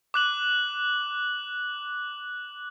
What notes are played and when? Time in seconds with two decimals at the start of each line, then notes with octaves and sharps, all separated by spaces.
0.14 D6 F#6 F#7